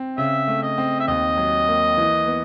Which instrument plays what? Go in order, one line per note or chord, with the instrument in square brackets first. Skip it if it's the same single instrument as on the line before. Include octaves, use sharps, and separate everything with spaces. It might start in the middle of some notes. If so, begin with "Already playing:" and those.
Already playing: [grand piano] C4
[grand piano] C#3 [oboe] E5
[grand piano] A3
[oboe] D#5
[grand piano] C4
[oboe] E5
[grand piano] D#2 [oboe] D#5
[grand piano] F#3
A#3
E3
B3